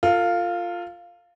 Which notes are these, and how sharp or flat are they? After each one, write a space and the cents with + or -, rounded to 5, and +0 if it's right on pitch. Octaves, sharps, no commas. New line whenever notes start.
F4 +0 A4 +45